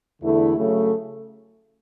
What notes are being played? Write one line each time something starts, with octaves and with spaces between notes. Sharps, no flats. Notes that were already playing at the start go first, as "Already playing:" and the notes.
E2 D3 A3 E4 G#4
C#3 F#3 A3